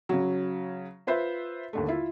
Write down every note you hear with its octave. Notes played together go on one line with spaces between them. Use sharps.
C#3 F#3
F4 B4 C5 E5
D#2 D3 A3
E4 F4 E5